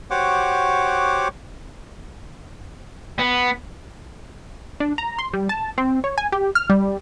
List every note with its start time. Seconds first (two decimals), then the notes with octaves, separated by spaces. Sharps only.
0.11 F#4 G4 C5 C#5 F#5 D6
3.19 B3
4.80 D4
4.98 A#5
5.19 C6
5.33 G3
5.49 A5
5.78 C4
6.04 C#5
6.18 G#5
6.32 G4
6.55 F6
6.70 G3